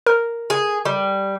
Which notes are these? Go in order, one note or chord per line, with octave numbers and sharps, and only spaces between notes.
A#4
G#4
G3